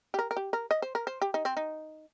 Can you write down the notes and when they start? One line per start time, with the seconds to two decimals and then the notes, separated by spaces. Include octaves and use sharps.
0.14 G4
0.19 A#4
0.31 A#4
0.37 G4
0.53 A#4
0.71 D#5
0.82 C5
0.95 A#4
1.07 C5
1.22 G4
1.34 D#4
1.45 C4
1.57 D#4